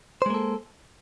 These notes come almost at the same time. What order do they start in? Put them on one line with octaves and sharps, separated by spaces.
C5 G#3 A#3 A4